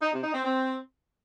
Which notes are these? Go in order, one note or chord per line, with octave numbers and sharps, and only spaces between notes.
D#4
C3
D#4
C4
C4